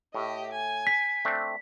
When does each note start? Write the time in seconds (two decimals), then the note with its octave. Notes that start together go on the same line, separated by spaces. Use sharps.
0.14 A2 G4 D#5
0.52 G#5
0.87 B6
1.25 A3 C4 D4